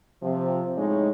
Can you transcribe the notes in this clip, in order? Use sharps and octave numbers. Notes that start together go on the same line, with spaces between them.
C3 F3
A2 G#3 D#4 C#5